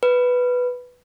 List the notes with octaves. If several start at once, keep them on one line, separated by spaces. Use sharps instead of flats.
B4